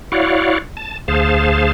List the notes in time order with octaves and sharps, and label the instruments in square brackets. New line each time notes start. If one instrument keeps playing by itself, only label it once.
[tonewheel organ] E4 F#4 C#5 D5 F5 F#5
A5
D2 G#4 C5 F5 A5